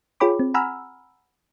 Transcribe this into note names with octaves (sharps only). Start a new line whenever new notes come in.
F4 G#4 C#5 G5 B5 D6
C4
F#5 G#5 A#5 B5 E6 F6